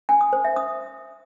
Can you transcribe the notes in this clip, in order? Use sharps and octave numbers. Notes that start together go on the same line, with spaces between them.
G#5
D#6
C5
E5
D#6